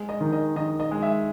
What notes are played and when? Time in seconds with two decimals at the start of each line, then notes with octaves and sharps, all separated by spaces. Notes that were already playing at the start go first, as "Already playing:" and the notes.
Already playing: G#3
0.09 D#5
0.21 D#3
0.32 D#5
0.56 D#3 D#5
0.80 D#5
0.91 G#3
1.02 E5